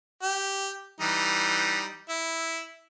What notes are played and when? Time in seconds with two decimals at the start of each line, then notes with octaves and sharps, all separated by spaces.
0.23 G4
1.01 E3 G3 D#4
2.10 E4